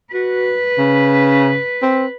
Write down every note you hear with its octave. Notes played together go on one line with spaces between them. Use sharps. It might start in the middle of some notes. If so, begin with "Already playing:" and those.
F#4 B4
C#3
C4